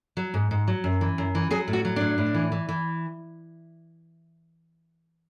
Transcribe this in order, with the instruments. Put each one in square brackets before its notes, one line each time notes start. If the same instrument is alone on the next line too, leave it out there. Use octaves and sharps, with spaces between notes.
[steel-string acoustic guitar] F#3
G#2
G#2
F#3
F#2
E3
F#2
E3
F#3 G#4
A2
F#4
F#3
A2 D4
A2
E3
E3
E3